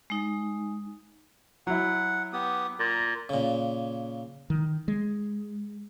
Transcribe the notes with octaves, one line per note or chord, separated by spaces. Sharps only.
G#3 D#4
F#3 E4 F#5
B3 G4 D#6
A#2 A#5
A#2 C#3
D#3
G#3